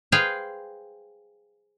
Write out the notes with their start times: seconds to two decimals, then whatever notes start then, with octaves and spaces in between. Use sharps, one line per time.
0.12 G#4 B4 C5 F5 G5